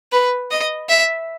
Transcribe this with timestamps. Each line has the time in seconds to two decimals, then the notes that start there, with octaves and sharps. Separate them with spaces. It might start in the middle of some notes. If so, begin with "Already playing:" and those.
0.12 B4
0.51 D#5
0.89 E5